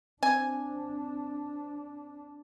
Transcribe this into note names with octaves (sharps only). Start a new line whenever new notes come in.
C4 D4 G#5